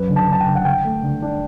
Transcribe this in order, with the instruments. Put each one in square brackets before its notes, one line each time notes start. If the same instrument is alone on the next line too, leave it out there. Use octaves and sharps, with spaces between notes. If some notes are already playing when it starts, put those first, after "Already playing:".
Already playing: [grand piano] F#2 B4
D3
A5
D3 A5
G5
D3
F#5
D3 G5
A3
D3
D4